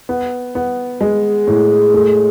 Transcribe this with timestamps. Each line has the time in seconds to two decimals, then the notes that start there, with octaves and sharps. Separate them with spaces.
0.09 B3
0.55 B3
1.01 G#3
1.47 A2
1.94 A3